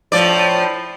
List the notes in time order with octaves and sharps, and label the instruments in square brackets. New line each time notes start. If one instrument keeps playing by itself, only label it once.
[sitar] A2 F3 D5